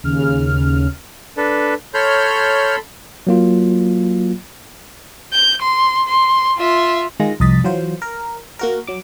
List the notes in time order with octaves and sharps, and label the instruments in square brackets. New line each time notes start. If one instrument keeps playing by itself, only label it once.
[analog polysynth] D#2 C#3 F6
[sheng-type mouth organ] D4 A4 B4
[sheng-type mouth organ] A4 B5 C6 [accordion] C#5 F6 G6
[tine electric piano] F#3 A#3 F4
[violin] G6
C6
C6
F4 E5
[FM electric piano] D#3 G#3 F4 A#6
C2 F2 D#5 A6 B6
E3 F#3 F4 C5
A#4
A#3 F#4 A#4
F#3 D6